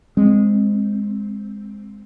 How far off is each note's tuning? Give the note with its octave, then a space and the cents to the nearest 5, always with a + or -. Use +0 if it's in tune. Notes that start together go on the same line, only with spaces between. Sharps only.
G#3 -10 C4 +0